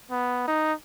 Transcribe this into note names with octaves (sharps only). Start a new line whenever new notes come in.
B3
D#4